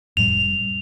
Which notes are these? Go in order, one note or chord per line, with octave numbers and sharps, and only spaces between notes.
F1 A2 G3 F7